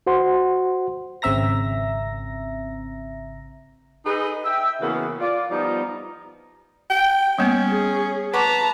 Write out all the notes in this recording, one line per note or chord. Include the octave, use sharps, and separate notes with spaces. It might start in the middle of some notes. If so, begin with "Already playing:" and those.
F#4 C5 F#5 C6
G#1 C#3 C4 E5 A#5 A#6
D#4 G#4 A4 B4 D#5
E5 G5
C#3 E3 A#3 B3 F#4 G#4
F4 D5
F3 G3 B3 D#4
G5
G3 A#3 B3 C#4
G#4
B4 F#5 A5 A#5 C#6 D6